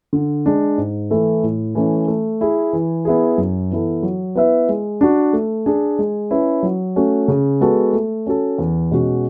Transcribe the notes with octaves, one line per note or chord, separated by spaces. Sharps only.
D3
G#3 D4
G#2
E3 A3 E4 A4
A2
E3 A3 C#4
A3
E4 G#4
E3
B3 E4 G#4
F#2
E3 B3 E4 A4
F#3
B3 E4 B4 E5
G#3
D4 F#4
A3
D4 G#4
G#3
C#4 E4 B4
F#3
A3 C#4 F#4
C#3
G#3 B3 F#4 A4
A3
C#4 F#4 A4
E2
B2 G#3 C#4 F#4